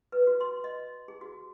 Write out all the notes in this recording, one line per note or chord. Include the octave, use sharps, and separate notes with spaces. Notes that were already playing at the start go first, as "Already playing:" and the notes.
B4
F#4
C6
D#5
G#4
F#4